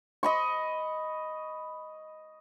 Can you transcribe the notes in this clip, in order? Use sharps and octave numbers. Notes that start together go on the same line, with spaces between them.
D#5 B5 C#6